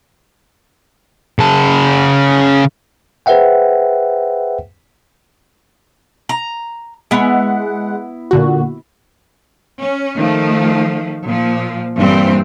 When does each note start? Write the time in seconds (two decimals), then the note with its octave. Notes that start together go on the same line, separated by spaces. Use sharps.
1.39 C#3 A5
3.26 G#4 B4 C5 E5 F#5 G5
6.29 A#5
7.11 G#3 B3 E4 F#5
8.31 A#2 D3 F#4
9.77 C#4
10.17 D#3 F3 A3
11.26 A#2 F3
11.97 G2 A#2 E3 G3 C4